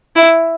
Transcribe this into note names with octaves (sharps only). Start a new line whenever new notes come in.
E4